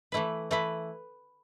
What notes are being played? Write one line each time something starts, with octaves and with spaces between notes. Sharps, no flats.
E3 A3 E4 B4
E3 A3 E4 B4